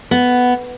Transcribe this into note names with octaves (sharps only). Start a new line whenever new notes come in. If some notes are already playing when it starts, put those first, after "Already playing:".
B3